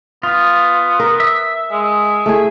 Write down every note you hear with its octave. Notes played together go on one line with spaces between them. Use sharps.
B3 F4
A#4
E5
G#3
A3 E4 G#4